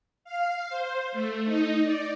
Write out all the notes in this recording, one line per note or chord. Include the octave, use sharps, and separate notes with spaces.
F5
C5
A3
D#4
D5